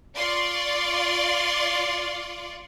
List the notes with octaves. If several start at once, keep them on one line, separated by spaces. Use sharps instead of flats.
F4 D5 C6 C#6